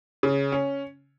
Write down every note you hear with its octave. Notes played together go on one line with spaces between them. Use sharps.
C#3
C#4